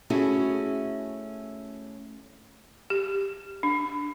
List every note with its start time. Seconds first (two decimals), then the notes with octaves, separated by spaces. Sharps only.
0.10 A3 C#4 E4 F#4 G#4 A4
2.90 G4
3.63 D4